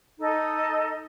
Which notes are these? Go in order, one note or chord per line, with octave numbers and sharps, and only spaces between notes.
D#4 A4 D#5